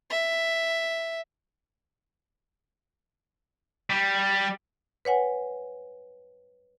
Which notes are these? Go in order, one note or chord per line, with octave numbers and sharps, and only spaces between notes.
E5
G3
B4 C#5 F#5 G#5